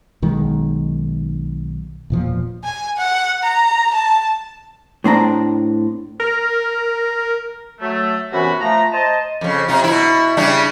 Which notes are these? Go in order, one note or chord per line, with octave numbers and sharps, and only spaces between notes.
B1 D#3 G#3
E1 A#2 F3
G#5
F#5
A#5
A5
A2 C4 D4 A#5
A#4
F#3 A3
F#2 C3 E3 B3 F#4 B5
F3 A3 A#5
C5 D#5 A5
F2 C#3
C3 F4
B2 E4
C#3 G3 D4